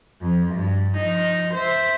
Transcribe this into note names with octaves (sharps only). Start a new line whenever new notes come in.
F2 F3
G2
F3 D#4
C5 E5